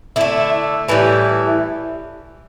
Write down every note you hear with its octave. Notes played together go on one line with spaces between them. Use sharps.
D3 A3 E4
A2 E3 G3